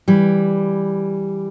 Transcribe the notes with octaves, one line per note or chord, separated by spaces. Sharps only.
E3 G3